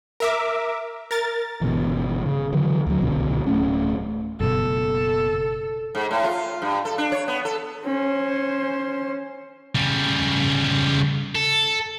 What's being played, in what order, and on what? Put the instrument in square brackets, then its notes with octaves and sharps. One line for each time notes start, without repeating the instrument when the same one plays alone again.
[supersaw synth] A#4 E5 D6
A#4 A6
[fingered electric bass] G1 B2 E3
C#3
D3 E3 F#3
D2 D3 F#3
D#1 C2 B2 D3
D1 A2 A3 C#4
[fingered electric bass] F#1 B2 [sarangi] A4
[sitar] G#2
A2
F4
G2
A4
D4
C#5
B3
A4
[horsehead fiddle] C#4 C5
[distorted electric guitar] C#3 G3
A4